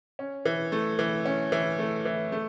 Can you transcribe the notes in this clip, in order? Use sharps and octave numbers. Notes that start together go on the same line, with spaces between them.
C#4
E3
A3
E3
C#4
E3
A3
E3
A3